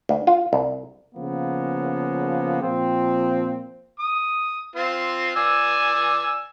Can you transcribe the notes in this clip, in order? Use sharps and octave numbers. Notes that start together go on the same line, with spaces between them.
D2
F4
C2
C#3 F3 A#3 B3
A#2 F3 C4
D#6
C4 F4
D5 G#5 E6